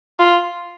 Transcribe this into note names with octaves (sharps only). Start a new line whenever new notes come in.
F4